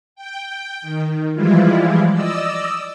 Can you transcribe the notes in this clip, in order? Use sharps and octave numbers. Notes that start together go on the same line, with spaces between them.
G5
D#3
E3 F3 G3 G#3 E4 F4
D5 D#5 E6